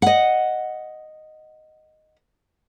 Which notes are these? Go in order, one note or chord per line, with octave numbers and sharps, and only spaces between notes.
D#5 F#5